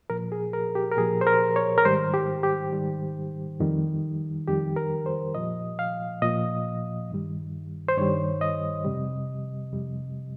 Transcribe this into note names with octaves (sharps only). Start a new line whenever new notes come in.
A#2 F3 A#4
G#4
A#4
G4
A#4
A#2 F3 G#4
C5
A#4
C#5
A#4
G#2 D#3 G3 C5
G4
G4
G#2 D#3 G3
F2 D#3 G3
F2 D#3 G3 G4
A#4
C5
A#2 F3 D#5
F5
A#2 F3 D#5
G2 D#3 G3
C5
G2 D#3 G3 C#5
D#5
F2 C3 G3
F2 C3 G3